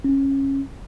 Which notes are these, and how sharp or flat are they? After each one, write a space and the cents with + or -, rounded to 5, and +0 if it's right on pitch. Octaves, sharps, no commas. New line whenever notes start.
C#4 -20